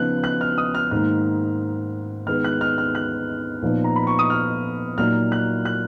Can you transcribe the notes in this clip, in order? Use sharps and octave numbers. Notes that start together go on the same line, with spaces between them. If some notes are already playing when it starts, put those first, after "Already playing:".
Already playing: C#3 F3 B3 D#4 F#6
F#6
F6
D#6
F6
G#2 D#3 A#3 F6
D#3 G#3 B3 F6
F#6
F6
F6
F#6
A#2 F3 B3 D#4
A#5
B5
C#6
D#6
F6
A#2 F#3 A#3 D#4 F6
F#6
F#6